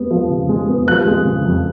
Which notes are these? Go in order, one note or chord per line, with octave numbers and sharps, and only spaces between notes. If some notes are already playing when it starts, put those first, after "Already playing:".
Already playing: G#3 B3
F3
C#3
G#3
B3
F3 F#6
G#3
C#3
F2